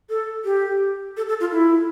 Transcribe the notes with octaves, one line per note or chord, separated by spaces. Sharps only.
A4
G4
A4
A4
F4
E4